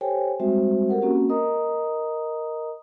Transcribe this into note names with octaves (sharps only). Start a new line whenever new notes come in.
G4 A4 C5 C#5 G5 G#5
G3 G#3 C4 F#4 C5 E5
G4 A4 A#4 F#5
A#3 C4 C#4 F#4
A#4 D#5 A#5 D#6